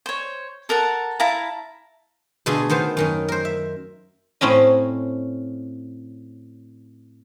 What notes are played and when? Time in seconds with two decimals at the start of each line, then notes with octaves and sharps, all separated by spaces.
0.06 C5 C#5
0.69 A4 A#4 F#5 A5
1.20 E4 F5 A5 A#5
2.46 B2 D3 A3 F4 G#4 G#5
2.70 D#3 B3 C5 A5
2.97 F#2 D#3 C#4
3.28 A#4 C5
3.45 E5
4.41 A2 C4 C#4 D#5